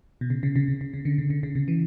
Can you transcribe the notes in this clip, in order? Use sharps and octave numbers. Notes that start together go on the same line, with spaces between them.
B2
C#3
C#3
C#3
C#3
C#3
C#3
D3
C#3
D3
C#3
C#3
E3